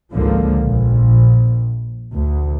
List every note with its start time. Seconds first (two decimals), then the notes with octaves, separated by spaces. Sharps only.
0.13 G#1 C#2 D3 F3 A#3
0.59 A#1
2.14 D2